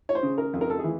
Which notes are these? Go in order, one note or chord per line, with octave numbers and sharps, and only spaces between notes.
C#5
C5
C#3
A#4
F2
A#4
A4
G#4
E3